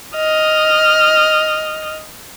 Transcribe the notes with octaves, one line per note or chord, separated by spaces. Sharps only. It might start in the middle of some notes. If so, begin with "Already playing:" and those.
D#5 F6